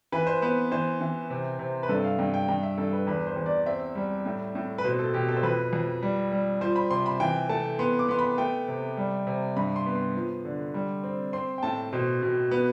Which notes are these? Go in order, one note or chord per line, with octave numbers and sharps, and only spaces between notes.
E3 B4
C5
B3 C5
E3 C5
E3
C3
C3
B4
G2 A4
F5
G2 G5
G5
G2 G5
E5
G2 A4
B4
E2 B4
C5
E2
D5
C4 E5
G3
A2
A2
B4
B2 C5
A4
B2 G4
A4
C5
F2 B4
F2
G3
G3
F3 C5
B5
C3 C6
B5
E3 G5
A3 A5
B3 C6
D6
B3 C6
B5
A3 G5
C3
G3
C3
G2 B5
C6
B3
C6
F3
D3
G3
C4
C4 C6
G5
A2 A5
B2 C5
B2
B3